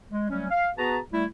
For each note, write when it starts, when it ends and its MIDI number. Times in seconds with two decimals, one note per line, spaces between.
0.11 0.27 56
0.30 0.46 54
0.30 0.46 55
0.30 0.46 57
0.30 0.46 61
0.51 0.69 77
0.77 0.99 59
0.77 0.99 66
0.77 0.99 68
0.77 0.99 71
0.77 0.99 81
0.77 0.99 82
1.13 1.25 55
1.13 1.25 57
1.13 1.25 64